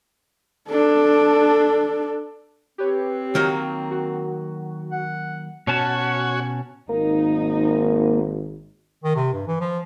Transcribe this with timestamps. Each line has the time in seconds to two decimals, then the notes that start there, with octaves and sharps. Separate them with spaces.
0.69 D4 A4
2.78 C4 G4 B4 C#5
3.35 D#3 F#3 A#3
3.91 F#4
4.91 F#5
5.67 B2 C#4 F#4 C#5 A5
6.89 G#1 A#3 D#4
9.04 D#3
9.16 C3
9.33 G2
9.47 E3
9.60 F3